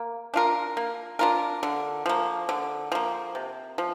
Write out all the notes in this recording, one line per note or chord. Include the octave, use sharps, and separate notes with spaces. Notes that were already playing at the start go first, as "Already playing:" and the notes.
Already playing: A#3
D4 F4 A#4
A#3
D4 F4 A#4
D3
F3 A#3
D3
F3 A#3
C3
F3